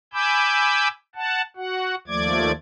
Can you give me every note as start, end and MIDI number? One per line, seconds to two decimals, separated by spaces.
0.13 0.88 80
0.13 0.88 83
0.13 0.88 86
0.13 0.88 88
0.13 0.88 91
1.15 1.42 78
1.15 1.42 81
1.56 1.95 66
1.56 1.95 78
2.07 2.52 39
2.07 2.52 53
2.07 2.52 57
2.07 2.52 74
2.07 2.52 86
2.07 2.52 92